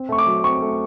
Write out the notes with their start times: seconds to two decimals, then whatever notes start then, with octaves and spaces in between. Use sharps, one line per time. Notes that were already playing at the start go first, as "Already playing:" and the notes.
Already playing: C4
0.09 A3 C#6
0.18 D6
0.27 F#3
0.44 C4 C#6
0.62 A3